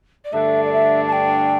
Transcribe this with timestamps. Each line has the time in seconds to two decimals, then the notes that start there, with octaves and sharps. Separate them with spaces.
0.25 D5
0.32 G2 D3 A3 D4 E5
0.65 D5
0.72 E5
1.06 A5
1.12 G5